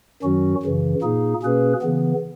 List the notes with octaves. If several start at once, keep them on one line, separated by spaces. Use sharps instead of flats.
F#2 D#3 F#3 C#4 F#4
F#2 C#3 E3
A#2 A#3 D#4 G#4
B2 A#3 C#4 G#4 B4
C#3 E3 B3